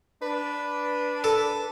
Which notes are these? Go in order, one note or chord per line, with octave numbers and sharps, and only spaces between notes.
D4 B4
A4